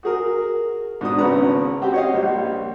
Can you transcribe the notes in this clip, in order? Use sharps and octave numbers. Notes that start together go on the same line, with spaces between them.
F#4 G#4 A#4
G#2 B2 D4 D#6
G#1 C#3 B3 B4 A#5
C4 F#4 G4
C#5 D#5 F5
A#1 G3